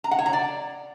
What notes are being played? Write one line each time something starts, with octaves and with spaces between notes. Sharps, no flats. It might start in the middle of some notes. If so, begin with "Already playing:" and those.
A#5
F#5
C#5
A#5
D5